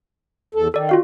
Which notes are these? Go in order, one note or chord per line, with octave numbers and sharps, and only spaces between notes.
E2 A4
D#3 A4 D5
F4 F#4 F5